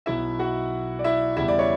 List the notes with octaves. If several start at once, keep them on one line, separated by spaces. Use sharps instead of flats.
B1 B2 F#3 B3 E4 E5
F#4 F#5
D5
E4 E5
E2 C#3 G3 B3 E4 E5
D5
C#5